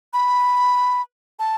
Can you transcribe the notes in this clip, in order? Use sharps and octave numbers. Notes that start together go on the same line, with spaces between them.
B5
A5